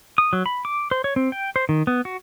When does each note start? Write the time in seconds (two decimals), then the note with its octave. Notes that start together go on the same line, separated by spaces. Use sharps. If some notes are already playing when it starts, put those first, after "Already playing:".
0.18 D#6
0.33 F#3
0.46 B5
0.65 D6
0.91 C5
1.04 C#5
1.16 C4
1.32 G5
1.56 C5
1.69 D#3
1.87 B3
2.05 F#4